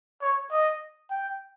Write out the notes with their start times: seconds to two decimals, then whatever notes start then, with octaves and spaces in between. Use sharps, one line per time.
0.22 C#5
0.51 D#5
1.10 G5